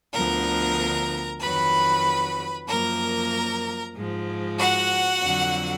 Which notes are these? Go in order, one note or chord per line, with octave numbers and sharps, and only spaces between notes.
D2 D3 F3 B3 A#4 A#5
F2 D#3 F#3 B4 B5
F#2 F3 A#3 A#4 A#5
G#2 F3 G#3
F#4 F#5
F2 D3 F#3